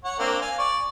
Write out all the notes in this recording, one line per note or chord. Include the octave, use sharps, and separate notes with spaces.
C#5 F#5
A#3 C4 D4
F5 G#5
D5 C#6